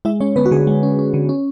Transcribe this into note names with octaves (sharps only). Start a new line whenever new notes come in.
G#3 E4 E5
G#3 C#4 C#5
D3 B3 B4
F#4
D3 G#4
G#3
C#4
C#4
D3
C#4